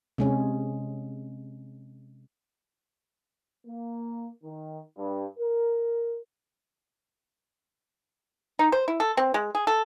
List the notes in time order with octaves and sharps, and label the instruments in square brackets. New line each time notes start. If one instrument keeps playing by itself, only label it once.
[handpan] C3 G#3 C#4
[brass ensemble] A#3
D#3
G2
A#4
[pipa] D#4
C5
E4
A4
C4
G#3
G#4
A4